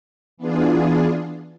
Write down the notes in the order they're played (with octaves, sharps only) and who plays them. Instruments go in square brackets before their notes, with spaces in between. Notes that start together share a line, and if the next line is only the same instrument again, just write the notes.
[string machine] E3 B3 D4 F4 G#4